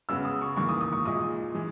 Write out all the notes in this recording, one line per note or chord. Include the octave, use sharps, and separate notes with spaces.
C#3 G#3 B3 E6
D#6
C#6
E2 D#3 A#3 C#6
D#6
D#6
C#6
A#2 G#3 D#4 D#6
E3 G#3